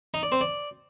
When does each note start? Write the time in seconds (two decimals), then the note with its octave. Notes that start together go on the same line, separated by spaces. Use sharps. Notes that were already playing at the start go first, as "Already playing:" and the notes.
0.14 D#4
0.23 D5
0.32 C4
0.41 D5